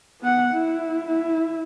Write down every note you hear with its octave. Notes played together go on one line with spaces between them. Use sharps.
B3 F#5
E4
E4